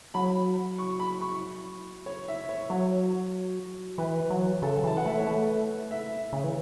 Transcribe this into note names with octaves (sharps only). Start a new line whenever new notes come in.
F#3 B5
C#6
B5
C#6
C#5
E5
C#5
F#3 C#5
E3 B4
F#3
C#3 A4
E3 A5
F#5
A3 E5
C#5
A3 B4
E5
C#3
E3